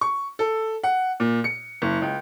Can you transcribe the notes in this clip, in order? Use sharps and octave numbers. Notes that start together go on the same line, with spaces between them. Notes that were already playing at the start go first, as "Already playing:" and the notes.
C#6
A4
F#5
A#2
C#7
F#1
C#2